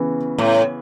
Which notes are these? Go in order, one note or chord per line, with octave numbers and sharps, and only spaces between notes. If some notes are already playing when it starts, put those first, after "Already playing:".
Already playing: C#3 E3 B3
A2